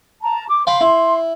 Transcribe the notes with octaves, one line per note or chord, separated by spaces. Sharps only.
A5 A#5
D6
F5 G5 B5 C6
E4